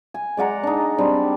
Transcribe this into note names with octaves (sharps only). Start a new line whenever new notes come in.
G#5
G#3 D5 F#5 A#5
D4 D#4
G3 C4 D4